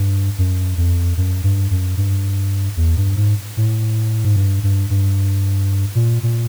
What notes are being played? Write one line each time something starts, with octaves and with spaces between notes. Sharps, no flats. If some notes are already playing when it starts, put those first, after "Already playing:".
Already playing: G2
F#2
F2
F#2
G2
F#2
G2
E2
G2
G#2
A2
G#2
G2
G2
G2
A#2
A#2